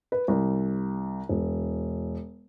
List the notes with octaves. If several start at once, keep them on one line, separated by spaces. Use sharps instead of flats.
B4
C2
E1